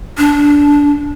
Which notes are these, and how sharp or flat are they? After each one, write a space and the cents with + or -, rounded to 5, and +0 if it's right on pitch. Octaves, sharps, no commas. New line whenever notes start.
D4 -15